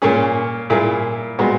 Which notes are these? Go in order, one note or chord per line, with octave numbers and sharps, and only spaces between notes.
A#2 A#3 C#4 G#4
A#2 A#3 E4 G#4
A#2 G#3 B3 F#4